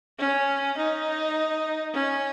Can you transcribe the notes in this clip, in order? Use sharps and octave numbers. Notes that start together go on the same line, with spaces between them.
C#4
D#4
C#4